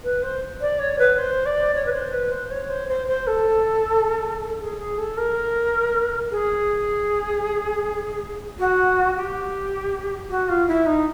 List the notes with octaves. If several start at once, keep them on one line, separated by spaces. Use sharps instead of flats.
B4
C5
D5
C#5
B4
C5
D5
C#5
B4
C5
B4
C5
C#5
C5
C5
C5
A4
G#4
G#4
A4
A#4
G#4
F#4
G4
F#4
F4
E4
D#4